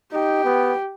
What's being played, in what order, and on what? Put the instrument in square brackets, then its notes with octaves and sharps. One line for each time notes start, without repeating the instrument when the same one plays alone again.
[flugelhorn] D#4 [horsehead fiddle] G4
[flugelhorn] B3